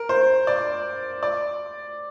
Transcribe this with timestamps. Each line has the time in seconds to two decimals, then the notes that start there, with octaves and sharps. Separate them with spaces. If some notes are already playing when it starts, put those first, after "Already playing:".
Already playing: A#4
0.09 C5
0.47 D5
1.23 D5